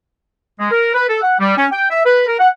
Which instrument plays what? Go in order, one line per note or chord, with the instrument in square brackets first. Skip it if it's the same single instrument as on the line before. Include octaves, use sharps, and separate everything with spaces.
[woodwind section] G#3
A#4
B4
A4
F#5
G3
C#4
G5
E5
B4
A#4
F#5